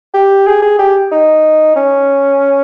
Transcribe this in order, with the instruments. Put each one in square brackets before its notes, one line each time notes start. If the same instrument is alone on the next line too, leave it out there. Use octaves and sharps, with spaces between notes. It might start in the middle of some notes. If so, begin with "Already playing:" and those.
[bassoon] G4
G#4
G#4
G4
D#4
C#4